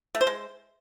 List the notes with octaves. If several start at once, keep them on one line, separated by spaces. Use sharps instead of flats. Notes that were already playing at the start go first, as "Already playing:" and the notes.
A3
C5
G#3